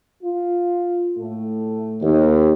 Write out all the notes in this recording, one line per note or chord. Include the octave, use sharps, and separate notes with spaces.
F4
A2 A3
D#2